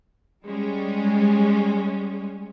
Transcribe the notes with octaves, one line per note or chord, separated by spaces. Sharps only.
G3 G#3 C#4